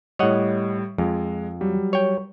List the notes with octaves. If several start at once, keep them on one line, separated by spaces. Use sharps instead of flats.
A2 G3 C#5 D#5 F#5
F2 G#3
F#3 G3
C#5 G5